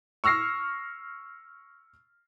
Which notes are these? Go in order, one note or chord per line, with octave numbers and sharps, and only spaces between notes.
C#6 E6 F6 A#6 C7